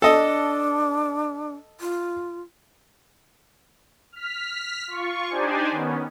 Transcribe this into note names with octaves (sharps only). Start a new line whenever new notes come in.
D4 A4 D#5
F4
F6 B6
F4 C#6
D4 D#4 G4 C5 D5 G#5
D#3 B3 C#4